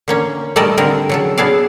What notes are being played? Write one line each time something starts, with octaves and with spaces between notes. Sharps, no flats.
D3 A#3 C#4
G3 A3 A4 A#4 D5 D#5
D3 C4 A#4
C#3 F#3 A4
C#3 B3 G#4 A4 D5 F5